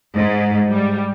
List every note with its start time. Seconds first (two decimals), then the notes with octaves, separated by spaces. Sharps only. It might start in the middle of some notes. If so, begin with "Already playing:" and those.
0.16 G#2
0.69 G3